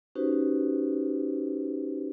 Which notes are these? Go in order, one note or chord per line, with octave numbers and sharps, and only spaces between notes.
C#4 D#4 F#4 G4 B4 C5